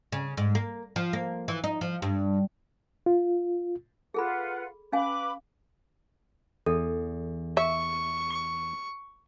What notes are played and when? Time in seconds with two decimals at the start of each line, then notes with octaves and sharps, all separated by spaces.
0.12 C#3
0.37 G#2
0.55 A#3
0.96 F3
1.13 A#3
1.48 E3
1.64 D#4
1.81 F3
2.02 G2
3.06 F4
4.14 F4 G#4 A4 B4 F#5 B5
4.92 C#4 B4 F5 G#5 B5 D6
6.66 E2 A4
7.57 E5 C#6